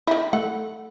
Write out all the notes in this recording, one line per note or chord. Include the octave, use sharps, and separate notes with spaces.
D#3 D#4 E4
A3 F#5